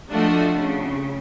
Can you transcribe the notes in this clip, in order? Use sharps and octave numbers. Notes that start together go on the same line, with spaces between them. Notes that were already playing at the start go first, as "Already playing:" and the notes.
F3 A3 D4 F4 F#4 D#5
C#3